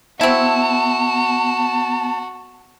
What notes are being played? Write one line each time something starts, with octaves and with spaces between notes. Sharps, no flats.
B3 C4 E4 F#4 A5